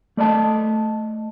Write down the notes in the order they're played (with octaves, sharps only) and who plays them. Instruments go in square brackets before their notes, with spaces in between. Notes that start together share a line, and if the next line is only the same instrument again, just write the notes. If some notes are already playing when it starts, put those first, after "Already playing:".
[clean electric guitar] A3 D5 D#5 A5